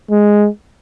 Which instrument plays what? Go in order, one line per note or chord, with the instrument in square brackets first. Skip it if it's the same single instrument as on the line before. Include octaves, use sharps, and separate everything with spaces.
[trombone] G#3